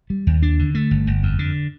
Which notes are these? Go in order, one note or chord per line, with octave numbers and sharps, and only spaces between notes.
G3
D#2
D4
D3
A3
G1
G1
F2
D3